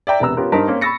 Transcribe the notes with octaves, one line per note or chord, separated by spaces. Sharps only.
D5 E5 G5 A#5
E1 C3 B3 A#5 E6
B3 C#4 F4 G4 A#4
G2 D#4 A#4 C5 A5 B6
A#3 C4 C#4
B5 C#6 E6 A6 A#6 C#7